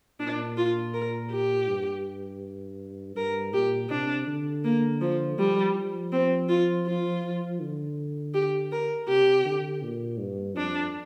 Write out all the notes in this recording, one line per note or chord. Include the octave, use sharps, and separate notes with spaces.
A#2 D4
F4
A#4
G4
G2
G2 A#4
A#2 G4
C3 D4
D3
A#3
F3
F3 G3
F3
C4
F4
F4
D3
G4
A#4
C3 G4
D3
A#2
G2
F2 D4